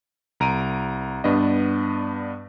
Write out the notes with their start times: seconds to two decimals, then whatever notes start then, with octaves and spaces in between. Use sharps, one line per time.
0.40 C2 A#5 D7 D#7
1.24 G2 B3 D4 D#5